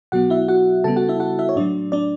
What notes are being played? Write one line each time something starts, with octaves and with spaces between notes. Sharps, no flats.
B2 F#3 B3 F#4 F#5
E4 E5
F#4 F#5
C#3 G3 B3 A4 A5
F#4 F#5
E4 E5
F#4 F#5
E4 E5
C#5
A2 F#3 A3 D4 D5
D4 D5